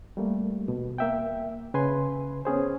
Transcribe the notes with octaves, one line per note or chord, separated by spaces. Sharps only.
G3 A3 A#3
B2
A#3 E5 G5
C#3 B4 G#5 C6
B3 C#4 G#4 C5